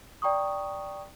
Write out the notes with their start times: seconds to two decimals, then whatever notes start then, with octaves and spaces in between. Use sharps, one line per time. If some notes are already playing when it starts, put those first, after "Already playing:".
0.22 D5 G5 A#5 C#6 D#6